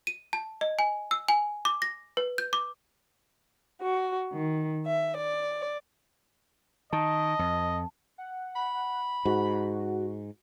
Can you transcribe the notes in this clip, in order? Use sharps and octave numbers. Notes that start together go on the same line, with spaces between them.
D#7
A5
D#5
G#5
E6
G#5
D6
A#6
B4
G6
D6
F#4
D#3
E5
D5
D#3 D#5 A5
F2
F#5
B5
G#2 F#4